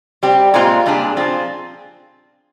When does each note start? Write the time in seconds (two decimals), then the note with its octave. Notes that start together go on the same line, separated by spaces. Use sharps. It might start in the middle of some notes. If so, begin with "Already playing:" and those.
0.23 G3 C4 G4
0.54 A#2 G#3 C4 F4
0.86 A#2 G3 D4 G#4
1.17 F3 C4 F4 G#4